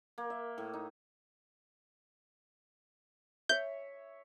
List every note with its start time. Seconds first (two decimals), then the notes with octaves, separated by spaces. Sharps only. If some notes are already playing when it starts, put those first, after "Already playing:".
0.18 A#3
0.30 E5
0.58 A2
0.74 D#4
3.49 C#5 E5 G6